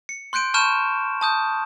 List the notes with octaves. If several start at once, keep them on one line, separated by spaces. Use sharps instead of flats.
C#7
C6 F#6 G6 D7 D#7
A5 B5 C#6 F6 G6 E7
A5 D#6 G6